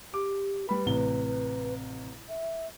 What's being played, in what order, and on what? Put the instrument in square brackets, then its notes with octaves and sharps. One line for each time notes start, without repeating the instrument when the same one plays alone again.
[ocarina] G4 [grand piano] D6
[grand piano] G3 B5 [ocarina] B4
[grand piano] A1 C3 G7
[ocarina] E5